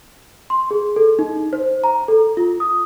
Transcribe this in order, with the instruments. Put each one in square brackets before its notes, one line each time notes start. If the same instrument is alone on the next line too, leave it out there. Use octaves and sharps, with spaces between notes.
[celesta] C6
G#4
A4
D#4
C5
A#5
A4
F4
D#6